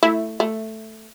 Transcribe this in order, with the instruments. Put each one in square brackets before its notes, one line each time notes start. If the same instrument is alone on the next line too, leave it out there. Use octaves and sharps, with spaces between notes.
[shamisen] A3 [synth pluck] E4
[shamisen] A3